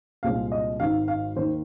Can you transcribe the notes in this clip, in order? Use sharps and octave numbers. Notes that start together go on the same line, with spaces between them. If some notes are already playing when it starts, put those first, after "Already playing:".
C2 A#2 G#3 C4 F5
D#5
G#1 G#2 D#3 F5
F5
D#2 D#3 A#3 C5